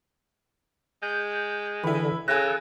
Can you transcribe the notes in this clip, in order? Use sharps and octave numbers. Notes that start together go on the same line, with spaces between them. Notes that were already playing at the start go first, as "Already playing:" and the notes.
G#3 G6
D3 E3 E4 B5
C#3 A4 G#5 F#6 A#6